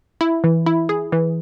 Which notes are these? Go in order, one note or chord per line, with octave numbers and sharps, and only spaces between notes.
E4
E3
E4
G#4
E3